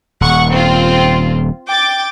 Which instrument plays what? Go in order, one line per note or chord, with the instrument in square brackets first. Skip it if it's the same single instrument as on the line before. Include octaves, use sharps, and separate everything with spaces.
[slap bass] D#1 [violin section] F#5 C#6
[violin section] C4 F4
G5 D6 A6